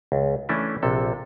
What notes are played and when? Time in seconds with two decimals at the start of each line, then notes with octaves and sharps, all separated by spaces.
0.12 C#2
0.49 E3 A3 C#4 D4 E4
0.83 A#1 C3 A4